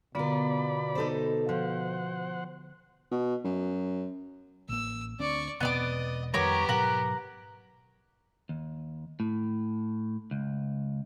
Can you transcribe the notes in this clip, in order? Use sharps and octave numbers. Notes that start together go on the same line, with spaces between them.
B2 D3 B3 F4 A#4 D5 B5
D#4 A4 C5
F3 C5 F#5
B2
F#2
A1 A#3 E6
D2 C4 D4 D5 C#6
E1 B2 B3 C4 D5 D#5 D6
F2 D#3 G3 B3 G4 A#4 C#5 D6
G#2 B2 F#3 A#4 F#5
D#2
A2
C#2